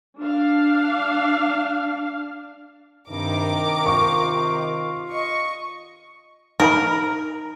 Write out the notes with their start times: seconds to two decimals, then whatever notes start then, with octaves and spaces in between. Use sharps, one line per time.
0.19 D4 F5
3.09 G2 C3 D#3 A#4 D6
3.86 F4 C#6
5.11 D#5 C#6
6.60 D#4 A#4 G#5 B5